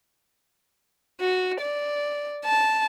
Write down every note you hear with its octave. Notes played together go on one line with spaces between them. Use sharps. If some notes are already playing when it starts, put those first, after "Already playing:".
F#4
D5
A5